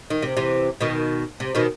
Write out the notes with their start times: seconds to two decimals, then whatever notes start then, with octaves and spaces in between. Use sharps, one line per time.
0.10 D#3
0.22 C3
0.37 C3 E3
0.81 B2 D#3
1.40 C3
1.55 B2 D#3